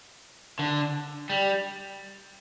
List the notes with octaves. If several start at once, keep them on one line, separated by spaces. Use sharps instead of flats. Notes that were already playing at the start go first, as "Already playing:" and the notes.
D3
G3